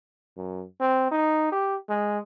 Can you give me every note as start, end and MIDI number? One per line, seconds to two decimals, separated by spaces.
0.37 0.65 42
0.80 1.07 60
1.11 1.51 63
1.52 1.76 67
1.89 2.18 56